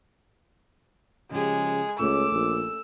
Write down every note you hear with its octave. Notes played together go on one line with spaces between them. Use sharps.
C#3 F3 G#3 G4 G#4
C#2 A3 C#4 D6 E6
A#1